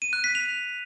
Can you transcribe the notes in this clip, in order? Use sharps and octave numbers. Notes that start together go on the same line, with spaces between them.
D#7
F#6
B6
F7